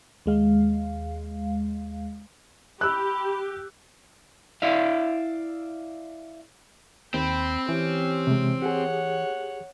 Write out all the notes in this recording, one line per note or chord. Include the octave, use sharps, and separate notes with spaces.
D#2 G#3 F5
G4 B5 E6 F#6
E4 D5 E5 F5
D#2 C4 G5 B5
E3 C#4 G4
C3 G#3
G4 G#4 C#5 F#5